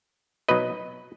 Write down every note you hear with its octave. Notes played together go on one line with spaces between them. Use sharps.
B2 F#3 D#4 B4 D#5